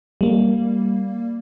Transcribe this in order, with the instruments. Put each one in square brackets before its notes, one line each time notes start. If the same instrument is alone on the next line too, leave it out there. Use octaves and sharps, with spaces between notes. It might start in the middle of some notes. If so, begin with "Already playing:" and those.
[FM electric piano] G3 A#3